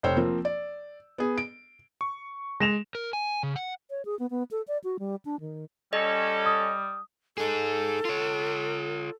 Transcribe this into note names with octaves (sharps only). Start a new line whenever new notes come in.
F1 C5 C#5 G5 E6
F3 A#3 C4
D5
B3 G#4
D7
C#6
G#3 A#6 E7 F7
A#4
G#5
C#3
F#5
C#5
G#4
B3
B3
A4
D5
F#4
G3
D4
D#3
G3 C#4 A4 D#5
D#6
D#4 G#4 A4
F4 C#5